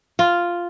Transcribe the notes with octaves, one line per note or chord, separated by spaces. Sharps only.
F4